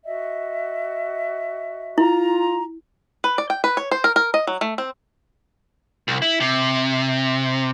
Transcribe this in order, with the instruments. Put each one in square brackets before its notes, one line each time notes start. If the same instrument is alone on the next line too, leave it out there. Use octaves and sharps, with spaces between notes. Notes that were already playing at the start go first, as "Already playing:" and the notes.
[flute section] F#4 D#5 E5
[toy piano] E4 [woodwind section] F4 A#5
[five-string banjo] B4
D5
G5
B4
C#5
C5
A#4
A#4
D#5
F#3
A3
C4
[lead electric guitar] C2
E4
C3